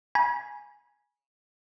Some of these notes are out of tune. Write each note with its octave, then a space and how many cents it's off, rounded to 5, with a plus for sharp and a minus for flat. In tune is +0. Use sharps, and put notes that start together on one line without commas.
G#5 +0 B5 -40